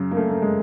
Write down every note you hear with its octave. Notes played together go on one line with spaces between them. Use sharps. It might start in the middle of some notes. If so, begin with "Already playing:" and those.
Already playing: F#2 C#3 F#3
A#3
A3
A3
G#3